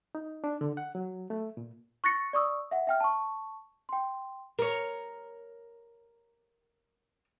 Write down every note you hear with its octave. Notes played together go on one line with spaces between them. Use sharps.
D#4
D4
D3
F#5
F#3
A3
A#2
C#6 F#6 A6 A#6 C#7
D5 C#6 D#6 E6
E5 F#5
E5 G5 F6
A5 C#6
G5 C6
A#4 C#5